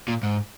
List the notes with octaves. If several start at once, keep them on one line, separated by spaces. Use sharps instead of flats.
A#2
G#2